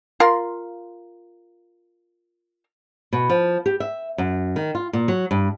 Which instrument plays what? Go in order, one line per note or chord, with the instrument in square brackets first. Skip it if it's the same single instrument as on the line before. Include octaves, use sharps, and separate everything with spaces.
[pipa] F4 A#4 F5 C6
[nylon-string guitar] B2
F3
G4
E5
F#2
D#3
F4
A#2
F#3
G2